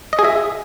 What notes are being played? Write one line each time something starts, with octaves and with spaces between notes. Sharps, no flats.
D#5
G#4
E5